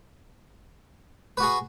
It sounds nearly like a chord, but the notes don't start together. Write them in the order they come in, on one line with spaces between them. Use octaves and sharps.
B4 F#4 G#4